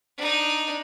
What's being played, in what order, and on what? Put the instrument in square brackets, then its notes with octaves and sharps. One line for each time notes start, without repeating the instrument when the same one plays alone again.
[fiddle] D4 D#4